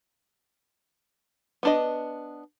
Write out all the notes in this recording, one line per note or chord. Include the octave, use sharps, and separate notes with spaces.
B3 D4 D#5